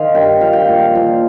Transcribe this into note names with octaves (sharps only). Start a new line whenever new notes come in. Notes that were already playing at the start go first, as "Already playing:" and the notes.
Already playing: D#3 C5 D#5 F5
G2 G5
F3 F5
G5
A#2 F5
F3